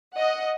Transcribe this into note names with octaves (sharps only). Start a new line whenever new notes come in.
D#5 F#5